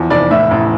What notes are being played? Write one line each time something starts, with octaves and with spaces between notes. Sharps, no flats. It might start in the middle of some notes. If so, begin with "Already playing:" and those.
Already playing: E2 F3
F1 D5
A2 E5
A1